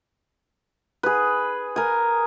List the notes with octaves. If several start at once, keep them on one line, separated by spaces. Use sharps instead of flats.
G#4 B4
A#4 G#5